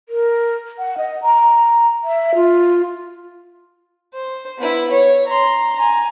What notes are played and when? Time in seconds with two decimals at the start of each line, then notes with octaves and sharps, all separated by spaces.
0.09 A#4
0.79 F#5
0.98 D#5
1.22 A#5
2.04 E5
2.35 F4
4.14 C5
4.58 B3 E4
4.91 C#5
5.27 A#5 C6
5.76 G#5 A#5